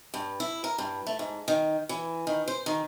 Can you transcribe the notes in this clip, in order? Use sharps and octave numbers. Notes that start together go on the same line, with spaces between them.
G2
E4
A#4
G2
A3
G#2
D#3
E3
D#3
C5
D#3